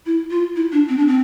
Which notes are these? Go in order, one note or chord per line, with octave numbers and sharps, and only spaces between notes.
E4
F4
E4
D4
C4
D4
C4